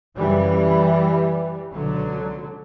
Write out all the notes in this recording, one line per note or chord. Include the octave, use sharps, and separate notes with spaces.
F#2 C#3 E3 G3
C#2 B2 D3 F#3